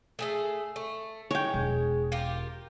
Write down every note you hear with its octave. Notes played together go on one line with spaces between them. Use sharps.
A3 G#4 A4
A3
G#3 C#5 G5
E1
F4 G4 A#4